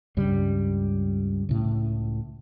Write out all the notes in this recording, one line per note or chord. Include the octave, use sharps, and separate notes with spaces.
C#2 G2 G3
C#2 A2